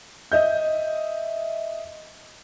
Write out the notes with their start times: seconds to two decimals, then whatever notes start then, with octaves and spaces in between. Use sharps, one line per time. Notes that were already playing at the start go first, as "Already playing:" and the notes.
0.32 D#5 E5 G6